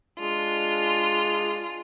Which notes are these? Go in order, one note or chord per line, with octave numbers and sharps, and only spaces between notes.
G#3 D4 F4 G#4